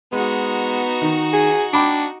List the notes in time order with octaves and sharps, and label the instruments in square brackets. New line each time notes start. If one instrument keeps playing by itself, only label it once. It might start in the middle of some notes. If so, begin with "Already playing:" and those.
[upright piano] G#3 [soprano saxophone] B3 [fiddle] D#4 F#4
[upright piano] D#3
[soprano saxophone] G#4
[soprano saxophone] D4 [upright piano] G5 B5 D6